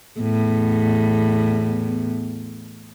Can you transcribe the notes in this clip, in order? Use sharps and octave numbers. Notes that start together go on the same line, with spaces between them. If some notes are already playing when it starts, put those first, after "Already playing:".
E2 A2 B3